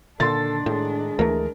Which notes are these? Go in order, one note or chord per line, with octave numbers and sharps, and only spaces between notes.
A#2 D3 D#3 D4 A4 C6 A6
A2 G#3
D2 E3 A3 A#4